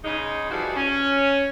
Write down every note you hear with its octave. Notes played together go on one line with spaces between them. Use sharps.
C#3 G#3 D#4
E3 F3 G3 G#3 E4 F#4
C#4